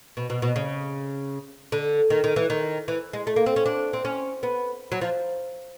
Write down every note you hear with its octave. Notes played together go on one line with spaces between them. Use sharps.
B2
B2
B2
C#3
D3
D#3
D#3
E3
D#3
E3
G#3
A3
A#3
C4
C#4
D4
C4
C#4
B3
F#3
F3